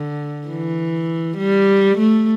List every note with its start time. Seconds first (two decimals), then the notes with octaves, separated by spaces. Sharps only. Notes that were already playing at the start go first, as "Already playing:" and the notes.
Already playing: D3
0.48 E3
1.37 G3
1.98 A3